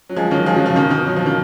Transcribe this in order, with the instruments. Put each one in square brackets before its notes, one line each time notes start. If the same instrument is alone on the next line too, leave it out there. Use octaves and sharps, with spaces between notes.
[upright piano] F#3
F3 G#3
D#3 F#3
F3 G#3
D#3 F#3
C#3 F3
B2 D#3
B2 D#3
F#3
F3
D#3